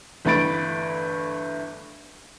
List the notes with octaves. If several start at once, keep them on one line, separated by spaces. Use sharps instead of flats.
G1 E3 A3 B5 A6 D7